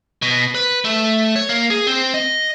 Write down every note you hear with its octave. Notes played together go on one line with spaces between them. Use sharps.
B2
B4
A3
C#5
A#3
G#4
C4
D#5